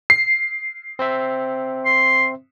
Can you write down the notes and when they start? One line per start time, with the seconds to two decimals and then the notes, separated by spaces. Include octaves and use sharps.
0.10 C7
0.99 C4 C5 E5
1.85 C6